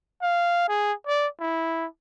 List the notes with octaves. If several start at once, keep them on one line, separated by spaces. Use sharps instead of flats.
F5
G#4
D5
E4